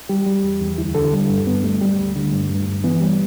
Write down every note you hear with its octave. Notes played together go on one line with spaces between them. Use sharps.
G3 G4
G3
E2
E2
D2 E4
D3 A4
G3
G2
G2 B3
G3 A3
G3
D2
D3
G2
G2
G2
E3 B3
G3